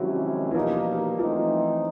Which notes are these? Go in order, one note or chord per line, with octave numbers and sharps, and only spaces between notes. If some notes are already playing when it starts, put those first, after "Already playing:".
Already playing: C3 D#3 F3 F#3 G#3 C#4 E4
E3
B2 F3 G3 A#3 D#4
E3 F3 A3 C4 D#4